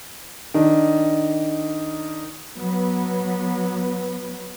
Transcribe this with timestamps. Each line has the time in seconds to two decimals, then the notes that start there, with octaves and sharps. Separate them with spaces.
0.54 D#3 D4
2.58 F#3 B3